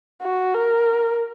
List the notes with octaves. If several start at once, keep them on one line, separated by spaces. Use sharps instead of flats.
F#4
A#4